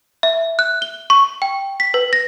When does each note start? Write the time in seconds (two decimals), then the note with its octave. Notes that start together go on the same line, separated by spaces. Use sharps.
0.23 E5
0.59 F#6
0.82 G7
1.10 C#6
1.42 G5
1.80 B6
1.94 B4
2.13 A#6